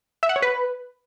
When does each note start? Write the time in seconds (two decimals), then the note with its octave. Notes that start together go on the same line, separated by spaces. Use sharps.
0.23 E5
0.29 F#5
0.36 C#5
0.42 B4